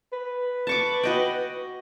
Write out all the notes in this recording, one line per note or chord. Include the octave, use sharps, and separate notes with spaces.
B4
A5 C#6 D6
F#4 D#5 G5